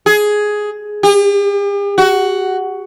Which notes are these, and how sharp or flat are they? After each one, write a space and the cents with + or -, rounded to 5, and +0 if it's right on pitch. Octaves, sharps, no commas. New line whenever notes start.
G#4 +10
G4 +45
F#4 +10